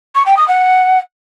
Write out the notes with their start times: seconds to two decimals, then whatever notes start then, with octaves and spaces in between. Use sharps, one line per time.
0.15 C#6
0.26 G5
0.37 D#6
0.48 F#5